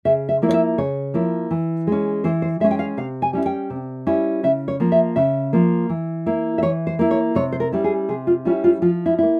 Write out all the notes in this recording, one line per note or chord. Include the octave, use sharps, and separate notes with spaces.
C#3 E5
E5
F3 A#3 E4
C#5
E5
C#3 C#5
F3 A#3 E4
E3
G#3 C#4
E3 C5
C5
G#3 C#4 E5
G5
F5
C3 F5
G#5
G3 C#4 E4
G5
C3
G3 C#4 E4
C#3 E5
C#5
F3 A#3
E5
C#3 E5
F3 A#3
E3
A#3 E4
E5
E3 C#5
C5
A#3 E4
C#5
C3 C#5
C5
A#4
G3 C#4 E4
G#4
C3 G#4
F4
G3 C#4 E4 F4
F4
F3 F4
E4
A#3 E4